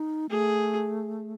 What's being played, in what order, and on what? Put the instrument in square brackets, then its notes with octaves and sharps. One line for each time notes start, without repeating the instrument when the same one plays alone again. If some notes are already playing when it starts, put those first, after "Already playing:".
Already playing: [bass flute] D#4
[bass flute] A3 [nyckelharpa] G#4